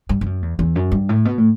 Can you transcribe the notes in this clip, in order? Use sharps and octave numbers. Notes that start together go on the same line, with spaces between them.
G2
G2
F#2
E2
E2
F#2
G2
A2
B2
A2